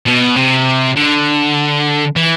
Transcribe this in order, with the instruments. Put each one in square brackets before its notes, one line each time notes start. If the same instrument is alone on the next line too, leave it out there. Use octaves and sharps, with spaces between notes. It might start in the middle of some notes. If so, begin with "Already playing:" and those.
[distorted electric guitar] B2
C3
D3
E3